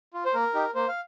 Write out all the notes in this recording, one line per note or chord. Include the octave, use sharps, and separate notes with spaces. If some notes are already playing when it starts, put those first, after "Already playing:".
F4
C5
A#3 A#4
D#4 G4
A#3 C5
F5